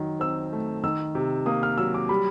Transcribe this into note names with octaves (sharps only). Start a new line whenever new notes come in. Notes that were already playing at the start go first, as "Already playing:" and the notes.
Already playing: D#3 F#3
C4 E6
A3
D#3 E6
C3
A#3 D#6
F6
F#3 E6
D6
G3 B5